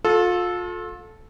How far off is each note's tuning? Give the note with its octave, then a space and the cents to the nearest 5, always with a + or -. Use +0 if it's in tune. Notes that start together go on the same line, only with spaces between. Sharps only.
F4 +35 A4 -10